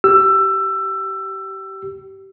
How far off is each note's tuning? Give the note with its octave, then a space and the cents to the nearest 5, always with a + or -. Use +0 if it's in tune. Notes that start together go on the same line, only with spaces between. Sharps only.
G4 -25 E6 +20